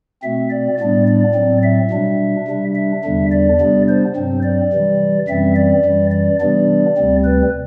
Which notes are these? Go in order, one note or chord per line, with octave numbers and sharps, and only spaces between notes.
B2 A3 C4 E5
D5
A2 G3 B3 D4 D5
D5
A2 F#3 C4
E5
B2 G3 D4
C3 G3 D4
E5
E2 D3 G3 D4
D5
C3 G3 B3 D4
C5
G2 F#3 C4
D5
C3 E3 G3
F#2 E3 G3 C4 E5
D5
F#2 E3 G3
D5
C3 E3 G3 B3 D4 D5
D2 C3 G3 C4
B4